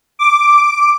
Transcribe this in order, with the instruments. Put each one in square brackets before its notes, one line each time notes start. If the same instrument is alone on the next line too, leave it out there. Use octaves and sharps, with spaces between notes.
[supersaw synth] D6